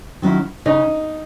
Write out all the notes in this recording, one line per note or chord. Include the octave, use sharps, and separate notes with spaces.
D#3 F#3 C#4 E4
C#3 D#4